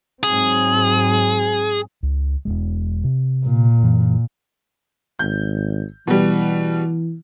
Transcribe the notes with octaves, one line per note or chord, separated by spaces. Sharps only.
G#2 F#3 C4 G#4
C#2
E1 C2 G#3
C3
A#2
F#2 E3
G#1 G6
B2 E3 G3